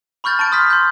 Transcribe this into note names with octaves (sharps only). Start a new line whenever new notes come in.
B5 C#6 F6 G6 A6
A5 C#6 A6 D7
C6 D#6 F6 G6 B6
C6 G6